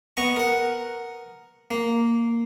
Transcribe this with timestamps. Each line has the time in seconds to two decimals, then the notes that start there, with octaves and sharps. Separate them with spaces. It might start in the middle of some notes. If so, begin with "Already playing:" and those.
0.17 B3 D#5 A#5 C#6
0.36 A#4 F#5
1.71 A#3